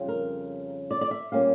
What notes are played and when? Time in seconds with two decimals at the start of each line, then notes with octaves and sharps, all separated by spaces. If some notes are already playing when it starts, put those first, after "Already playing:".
Already playing: F2 C#3 G3
0.08 A#4
0.91 D5
1.01 D5
1.11 E5
1.32 A#2 G3 A#3 C#4 F5